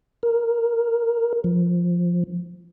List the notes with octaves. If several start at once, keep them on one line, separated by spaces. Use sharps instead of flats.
A#4
F3